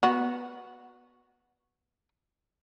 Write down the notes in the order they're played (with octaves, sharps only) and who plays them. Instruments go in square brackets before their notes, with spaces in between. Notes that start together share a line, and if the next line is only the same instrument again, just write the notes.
[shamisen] B3 F#4